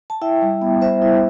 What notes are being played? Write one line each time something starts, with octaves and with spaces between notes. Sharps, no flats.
A5
E4 E5 G5
G3
B3
G3 C5 E5
E4